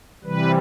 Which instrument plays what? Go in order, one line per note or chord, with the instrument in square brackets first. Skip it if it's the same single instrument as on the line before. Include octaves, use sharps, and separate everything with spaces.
[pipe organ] C3 E3 G3 B4